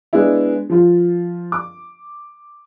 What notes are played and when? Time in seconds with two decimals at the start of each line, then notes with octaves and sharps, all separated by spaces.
0.13 G#3 B3 D4 E4
0.70 F3 F4
1.52 D6